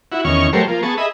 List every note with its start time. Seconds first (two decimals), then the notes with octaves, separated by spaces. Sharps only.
0.12 E4 F#4
0.25 E2 D#3 C#4 C#6 F6
0.53 F#3 G3 A3 A#4 C5 C#5
0.67 F3 A#3
0.83 B3 G#4 A5 C#6
0.98 G#4 D#5 E5 B5